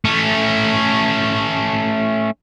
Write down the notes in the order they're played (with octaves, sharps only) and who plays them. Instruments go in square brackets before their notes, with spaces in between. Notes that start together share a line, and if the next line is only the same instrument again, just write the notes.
[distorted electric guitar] A3 C#4